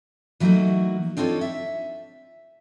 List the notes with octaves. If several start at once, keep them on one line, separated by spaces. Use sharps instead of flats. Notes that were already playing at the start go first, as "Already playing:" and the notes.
E3 F#3 A3 A#3 D#4 F#4
C4 D4 D#4 F4 A4 C#5
E5